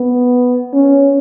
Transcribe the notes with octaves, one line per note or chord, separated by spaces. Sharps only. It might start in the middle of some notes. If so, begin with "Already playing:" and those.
Already playing: B3
C#4